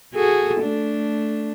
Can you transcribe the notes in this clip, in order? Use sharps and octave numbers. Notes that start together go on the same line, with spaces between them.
F#4 G#4 A4
A3 D4